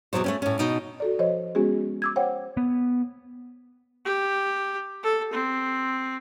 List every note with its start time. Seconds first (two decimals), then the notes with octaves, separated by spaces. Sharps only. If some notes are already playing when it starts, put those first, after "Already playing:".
0.13 E2 G#2 B2 F#3 C5
0.24 A3 C4 C#4
0.42 A2 C#4
0.59 B2 D#4
1.00 F#4 A4 D5
1.19 F3 C5 C#5 D#5
1.55 G#3 B3 C#4 F#4 G#4
2.02 D6 E6 G#6
2.16 C5 C#5 F#5 G5
2.57 B3
4.05 G4
5.03 A4
5.33 C4